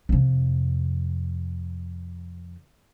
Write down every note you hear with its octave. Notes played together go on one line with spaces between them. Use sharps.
F2 C3